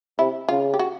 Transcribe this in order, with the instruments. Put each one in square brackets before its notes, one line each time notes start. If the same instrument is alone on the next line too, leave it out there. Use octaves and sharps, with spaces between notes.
[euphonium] C3 [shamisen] E4
[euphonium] C#3 [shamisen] F4
[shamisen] G4
F#4